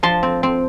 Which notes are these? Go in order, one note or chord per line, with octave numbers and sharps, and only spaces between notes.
F3 A5 C6
C4
C4